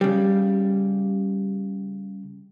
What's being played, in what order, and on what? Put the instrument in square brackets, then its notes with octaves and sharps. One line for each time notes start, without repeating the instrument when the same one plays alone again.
[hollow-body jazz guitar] C#3 G3